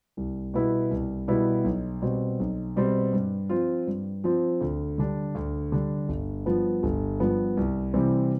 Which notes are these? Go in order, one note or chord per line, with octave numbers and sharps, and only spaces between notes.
C2
B2 G3 B3 E4
C2
B2 G3 B3 E4
B1
B2 G3 C4
B1
B2 G3 C4
G2
F3 C4 F4
G2
F3 C4 F4
D2
D3 G3 D4
D2
D3 G3 D4
G1
G2 F3 B3
G1
G2 F3 B3
C2
C3 E3 G3 C4